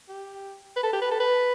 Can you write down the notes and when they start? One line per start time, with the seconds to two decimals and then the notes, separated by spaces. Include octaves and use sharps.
0.09 G4
0.77 B4
0.83 A4
0.93 G4
1.02 B4
1.11 A4
1.20 B4